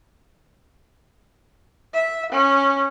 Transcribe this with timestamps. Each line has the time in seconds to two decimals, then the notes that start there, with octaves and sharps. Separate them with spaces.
1.94 E5
2.32 C#4